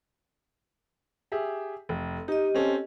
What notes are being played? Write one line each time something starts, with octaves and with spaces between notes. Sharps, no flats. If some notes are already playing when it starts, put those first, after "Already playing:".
G4 G#4 E5
F1
D#4 G4 D#5
C4 C#4 A4